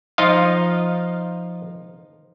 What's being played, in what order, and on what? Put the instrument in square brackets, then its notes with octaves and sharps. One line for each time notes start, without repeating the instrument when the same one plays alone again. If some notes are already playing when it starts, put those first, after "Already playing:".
[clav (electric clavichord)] F3 D#4 F4 D#5 F5